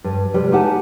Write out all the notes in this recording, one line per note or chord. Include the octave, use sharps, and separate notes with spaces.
G2
C3 G3 B4
D#4 E4 G4 F#5 G#5 A5